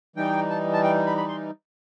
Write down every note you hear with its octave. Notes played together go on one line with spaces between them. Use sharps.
E3 G3 D#4 G5
A5
A5
G5
B5
B5
C6